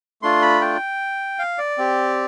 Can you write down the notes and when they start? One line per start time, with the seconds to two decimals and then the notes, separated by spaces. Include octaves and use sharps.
0.22 A3 D4 F4 C6
0.42 B5
0.61 G5
1.39 F5
1.58 D5
1.78 C4 G4